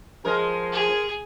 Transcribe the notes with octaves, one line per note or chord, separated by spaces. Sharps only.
F3 G#3 A#4
G#4